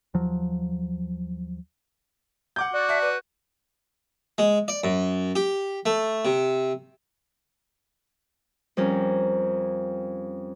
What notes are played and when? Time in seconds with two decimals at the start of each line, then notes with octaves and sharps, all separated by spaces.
0.14 D#2 F3 F#3
2.56 F#5 D6 G6
2.73 F#4 D5
2.89 E5 A5
3.02 B4
4.38 G#3
4.68 D5
4.84 F#2
5.36 G4
5.86 A3
6.25 C3
8.77 F2 G3 C#4 A#4